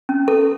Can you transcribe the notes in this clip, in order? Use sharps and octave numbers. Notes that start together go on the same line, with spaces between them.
C#4
A4